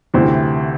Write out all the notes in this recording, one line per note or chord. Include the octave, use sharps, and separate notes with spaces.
D2 C3 E3 C5